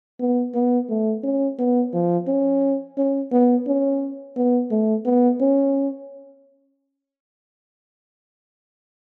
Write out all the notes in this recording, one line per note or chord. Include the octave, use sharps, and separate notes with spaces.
B3
B3
A3
C#4
B3
F3
C#4
C#4
B3
C#4
B3
A3
B3
C#4